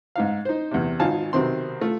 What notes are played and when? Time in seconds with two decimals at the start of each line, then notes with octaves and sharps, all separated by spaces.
0.16 G#2 D#4 F5
0.45 D#4 C5
0.71 E2 C3
1.00 G#1 D#4 F4 F5 G#5 A5
1.33 B1 C3 D#3 C4 C6
1.81 A3 F4